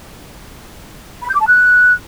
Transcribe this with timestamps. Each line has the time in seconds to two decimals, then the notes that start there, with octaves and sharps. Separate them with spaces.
1.21 B5
1.28 G6
1.34 D6
1.40 A5
1.46 F#6